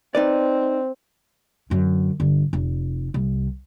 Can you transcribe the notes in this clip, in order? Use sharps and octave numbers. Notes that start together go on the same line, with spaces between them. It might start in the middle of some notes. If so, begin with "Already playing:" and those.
C4 D#4 B4 D5
F#2 D3
G1
F1
C2